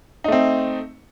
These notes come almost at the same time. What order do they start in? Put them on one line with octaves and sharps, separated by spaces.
D#4 A3 C4